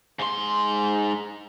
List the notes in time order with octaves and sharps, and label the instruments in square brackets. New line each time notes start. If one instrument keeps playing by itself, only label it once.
[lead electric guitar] G#2 C6